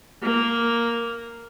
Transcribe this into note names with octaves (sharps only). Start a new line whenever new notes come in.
A#3